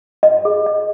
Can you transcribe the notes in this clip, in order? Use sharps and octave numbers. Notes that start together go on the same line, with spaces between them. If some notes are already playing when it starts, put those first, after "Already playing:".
D#5
G#4
D#5